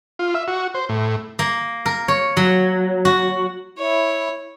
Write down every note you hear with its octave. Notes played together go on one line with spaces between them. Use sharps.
F4
E5
F#4
C5
A2
A#3
A#4
C#5
F#3
F#4
E4 C#5